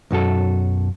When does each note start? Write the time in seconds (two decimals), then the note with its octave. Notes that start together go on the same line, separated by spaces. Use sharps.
0.11 B1 F#2 F#4 A4